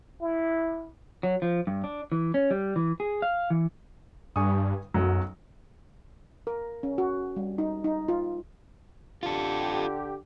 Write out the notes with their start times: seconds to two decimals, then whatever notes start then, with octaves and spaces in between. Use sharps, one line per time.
0.21 E4
1.23 F#3
1.42 F3
1.67 G2
1.84 D4
2.12 E3
2.34 C#4
2.51 G3
2.76 E3
3.00 G#4
3.22 F5
3.50 E3
4.36 G2 G#5 C#6 D#6
4.94 B1 F#2 F#3
6.47 A#4
6.83 C#4
6.98 F#4
7.36 G3
7.58 D#4
7.84 D#4
8.08 F4
9.23 D3 F4 G4 A4